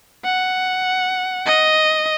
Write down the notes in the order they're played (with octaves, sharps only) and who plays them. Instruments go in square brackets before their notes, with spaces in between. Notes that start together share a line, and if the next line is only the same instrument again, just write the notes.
[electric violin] F#5
D#5